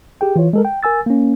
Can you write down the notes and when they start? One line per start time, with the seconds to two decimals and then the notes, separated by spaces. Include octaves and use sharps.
0.21 G4 G#4 G5
0.36 E3 F4 C#5
0.53 G#3 A4 A#4
0.65 G5
0.83 A#4 G#5 E6 A6
1.06 A#3 C#4